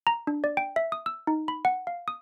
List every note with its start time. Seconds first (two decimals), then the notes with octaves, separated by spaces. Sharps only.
0.07 A#5
0.27 D4
0.44 D5
0.57 G5
0.76 E5
0.92 D#6
1.06 E6
1.27 D#4
1.48 B5
1.65 F#5
1.87 F5
2.08 D#6